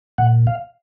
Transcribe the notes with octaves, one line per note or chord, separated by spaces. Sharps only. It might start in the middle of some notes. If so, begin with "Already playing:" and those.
A#2 F#5
F5